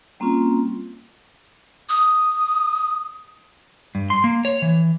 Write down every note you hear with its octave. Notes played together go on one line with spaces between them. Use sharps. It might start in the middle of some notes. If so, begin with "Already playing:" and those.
G3 A#3 C4 C#4 F4
D#6
G2
C6
A#3
C#5
E3